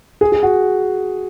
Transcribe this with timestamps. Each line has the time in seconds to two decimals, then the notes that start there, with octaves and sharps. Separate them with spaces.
0.21 G#4
0.32 G#4
0.43 F#4